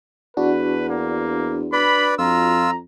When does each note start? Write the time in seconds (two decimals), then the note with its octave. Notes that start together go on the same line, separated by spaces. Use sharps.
0.37 E2 D4 F#4 B4
0.89 A#3
1.73 B4 D5 B5
2.18 F2 F4 A#5 E6